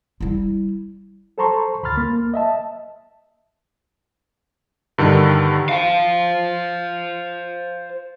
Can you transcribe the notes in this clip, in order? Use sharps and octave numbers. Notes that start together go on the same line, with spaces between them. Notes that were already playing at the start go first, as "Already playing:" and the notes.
G3 E4
A4 C5 A5 A#5 C6 C#6
D2 B5 C6 F6 A6
A#3
D#5 E5 A5
G2 D3 D#3
C5 F5